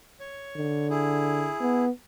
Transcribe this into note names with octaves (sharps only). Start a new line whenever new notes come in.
C#5
D3
E4 G#4
B3